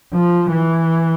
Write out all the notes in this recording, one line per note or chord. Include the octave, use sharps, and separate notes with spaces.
F3
E3